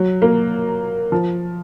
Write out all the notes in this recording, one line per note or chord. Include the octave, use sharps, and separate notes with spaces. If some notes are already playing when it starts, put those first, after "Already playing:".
Already playing: F#3
A#3
F3